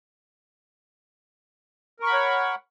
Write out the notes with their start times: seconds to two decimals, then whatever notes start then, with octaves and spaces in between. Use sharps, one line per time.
2.00 A#4
2.03 C#6
2.07 B5
2.10 F#5
2.13 C#5